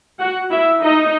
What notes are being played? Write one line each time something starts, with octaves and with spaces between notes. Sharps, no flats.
F#4 F#5
E4 E5
D#4 D#5